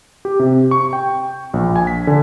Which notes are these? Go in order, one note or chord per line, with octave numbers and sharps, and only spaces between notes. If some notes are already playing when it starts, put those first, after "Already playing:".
G4
C3
C#6
G5
A#1
G#5
B6
D3